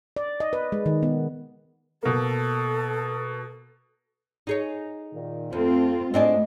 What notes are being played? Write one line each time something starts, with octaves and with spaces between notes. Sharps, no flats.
D5
D#5
B4
G#3
D#3
B3
B2 A#3 A4
D#4 G#4 C#5
A#2 D#3
F2 A3 C4 F4 A4
A2 C4 D4 G#4 D#5